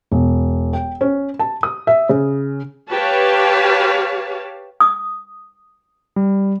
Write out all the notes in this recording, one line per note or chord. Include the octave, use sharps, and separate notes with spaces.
E1
G5
C#4
A5
D#6
E5
C#3
G4 B4 C#5 F5 A5
D#6
G3